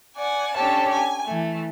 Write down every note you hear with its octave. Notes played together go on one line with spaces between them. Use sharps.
D5 F#5 G#5
C#4 D4 G4 A4 C#5 A5
G#5
E3 A3